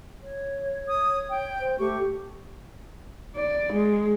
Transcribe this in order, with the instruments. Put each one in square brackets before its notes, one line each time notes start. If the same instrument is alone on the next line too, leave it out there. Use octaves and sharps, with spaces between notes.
[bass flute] C#5
[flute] D#6
G5
[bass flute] C5
[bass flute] A3 [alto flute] G4 [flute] C#6
[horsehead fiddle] D5
G#3